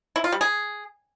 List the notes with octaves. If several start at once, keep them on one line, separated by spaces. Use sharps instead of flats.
E4
F4
G3
G#4